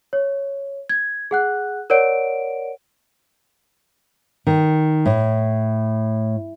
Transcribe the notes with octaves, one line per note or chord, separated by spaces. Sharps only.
C#5
G#6
G#4 F#5 F#6
A#4 C#5 D5 F#5 D7
D#3
A2